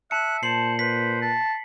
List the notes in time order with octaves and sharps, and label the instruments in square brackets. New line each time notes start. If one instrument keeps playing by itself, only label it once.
[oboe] E5 [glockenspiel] A5 C#7 [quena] F#6
[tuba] A#2 [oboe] C5 [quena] A5 [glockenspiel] C7 F#7
[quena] B4 [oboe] C5 [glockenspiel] B6
[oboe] A5